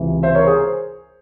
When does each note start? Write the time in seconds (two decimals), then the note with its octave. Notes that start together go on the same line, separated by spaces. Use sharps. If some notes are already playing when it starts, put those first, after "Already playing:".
Already playing: C#2 C3 E3
0.23 C5 E5
0.35 A#4 C#5
0.47 G#4 C5